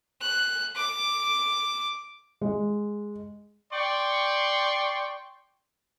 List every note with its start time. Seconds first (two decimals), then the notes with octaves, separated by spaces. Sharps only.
0.21 F#6
0.76 D6
2.41 G#3
3.72 D5 G5 C6 C#6